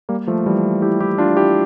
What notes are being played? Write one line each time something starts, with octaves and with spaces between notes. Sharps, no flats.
G3 A#3
F3 A3
E3 G3
E4 G4
E4 G4
D4 F4
E4 G4